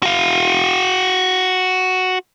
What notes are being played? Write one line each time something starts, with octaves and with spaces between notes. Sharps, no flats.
F#4 F5